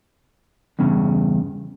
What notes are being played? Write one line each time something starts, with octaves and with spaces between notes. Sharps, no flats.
E2 G2 C#3